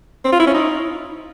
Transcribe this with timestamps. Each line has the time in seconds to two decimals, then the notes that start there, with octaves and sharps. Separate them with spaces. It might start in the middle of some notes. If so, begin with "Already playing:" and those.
0.25 C4
0.32 F4
0.40 E4
0.47 C#4
0.54 D#4